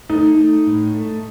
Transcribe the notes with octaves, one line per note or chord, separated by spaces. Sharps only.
A3 D#4
A3
A2
A3